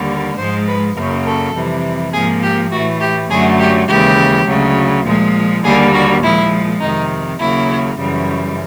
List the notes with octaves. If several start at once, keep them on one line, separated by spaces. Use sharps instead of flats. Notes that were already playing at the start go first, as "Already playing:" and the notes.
Already playing: D#2 D3 G3 A#3
G#2 F3 G#3 C5
B4
F#2 C#3 F#3 A#3 A#4
A4
F2 C3 E3 G3
G#2 F3 A#3 G#4
G4
A2 E3 A3 F#4
G4
F#2 D3 F#3 A3 G#4
G4
D#2 C#3 E3 G#3 G4
D2 C#3 F#3
A#2 F3 G#3
D#2 D3 G3 A#3 G#4
F#4
A#2 F3 G#3 E4
F2 C3 D#3 D#4
D#2 C#3 F#3 A#3 E4
F#2 C#3 E3 G3